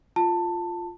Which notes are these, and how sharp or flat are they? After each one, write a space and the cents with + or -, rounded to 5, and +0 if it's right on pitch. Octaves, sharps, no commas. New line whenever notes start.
F4 +0 A5 +15